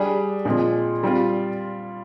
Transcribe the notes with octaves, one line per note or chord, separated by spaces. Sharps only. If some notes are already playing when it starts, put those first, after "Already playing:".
Already playing: G3 D4 G#4
A#2 F3 G#3 C4
G3 C4 F4